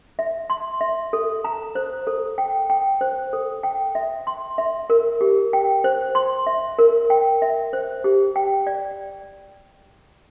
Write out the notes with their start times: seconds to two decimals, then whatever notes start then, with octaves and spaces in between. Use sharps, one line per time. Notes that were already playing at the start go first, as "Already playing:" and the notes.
0.19 E5
0.50 C6
0.81 E5
1.13 A4
1.45 A#5
1.75 C5
2.07 A4
2.38 G5
2.70 G5
3.01 C5
3.33 A4
3.63 G5
3.95 E5
4.27 C6
4.58 E5
4.90 A#4
5.21 G4
5.53 G5
5.84 C5
6.15 C6
6.47 E5
6.79 A#4
7.10 G5
7.42 E5
7.73 C5
8.04 G4
8.36 G5
8.67 D5